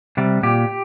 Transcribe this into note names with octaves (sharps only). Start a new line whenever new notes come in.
C3 G3
A#2 G4